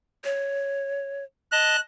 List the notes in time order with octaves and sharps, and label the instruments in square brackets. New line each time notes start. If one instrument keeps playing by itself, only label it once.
[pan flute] C#5
[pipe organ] D#5 A5 [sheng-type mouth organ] F#6